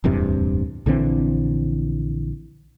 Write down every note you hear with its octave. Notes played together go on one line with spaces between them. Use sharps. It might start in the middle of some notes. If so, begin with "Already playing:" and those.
D1 E2 G2 C3
A#1 D3 E3 C4